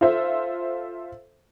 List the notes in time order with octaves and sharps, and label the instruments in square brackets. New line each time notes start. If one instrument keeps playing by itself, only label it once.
[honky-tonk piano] F4 A4 C5 E5